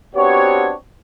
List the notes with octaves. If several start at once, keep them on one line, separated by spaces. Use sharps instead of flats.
B3 C4 D4 F#4 G4 C#5